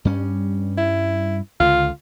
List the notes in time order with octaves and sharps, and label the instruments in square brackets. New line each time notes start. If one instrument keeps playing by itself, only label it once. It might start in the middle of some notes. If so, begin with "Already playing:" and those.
[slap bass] G2 G3 C#4
[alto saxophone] E4
[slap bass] C#2 D3 [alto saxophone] F4